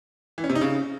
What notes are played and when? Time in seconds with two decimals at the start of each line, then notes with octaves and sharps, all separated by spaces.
0.38 E3
0.44 C#4
0.50 C3
0.55 D#4
0.61 C#3